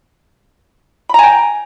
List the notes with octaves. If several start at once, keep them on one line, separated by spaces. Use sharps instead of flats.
G5 G#5 A#5 B5